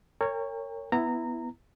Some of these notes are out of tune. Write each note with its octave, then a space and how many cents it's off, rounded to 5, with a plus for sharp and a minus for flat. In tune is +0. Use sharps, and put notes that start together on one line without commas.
A#4 -30 C#5 +0 G5 +40
B3 +0 E4 +0 A#5 -20